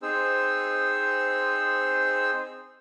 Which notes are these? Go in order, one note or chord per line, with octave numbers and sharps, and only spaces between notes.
C4 D#4 G#4 C5 E6